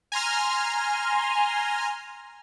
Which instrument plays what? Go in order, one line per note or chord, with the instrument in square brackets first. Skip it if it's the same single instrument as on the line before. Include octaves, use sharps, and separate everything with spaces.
[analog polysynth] G#5 A#5 C6 F6